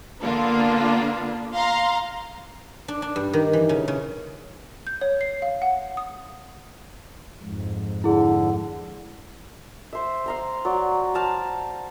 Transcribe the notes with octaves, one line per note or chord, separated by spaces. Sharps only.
D3 A#3 B3 D4 F4
F5 A#5 C6
D4
D4
G2
D#3
E3
C#3
C#3
G6
C#5
C7
F5
F#5
D#6
F2 G#2
D3 E4 G#4
C5 E5
F5 A#5 C6
F#3 D5
C5 F5 A5 A#5